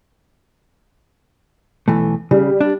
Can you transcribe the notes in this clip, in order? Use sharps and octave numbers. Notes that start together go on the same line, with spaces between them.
B1 E3 A3
C#3 G3
D4